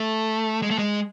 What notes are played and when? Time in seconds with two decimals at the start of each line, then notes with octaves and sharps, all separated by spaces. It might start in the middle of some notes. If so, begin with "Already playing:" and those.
Already playing: A3
0.62 G#3
0.71 A3
0.79 G#3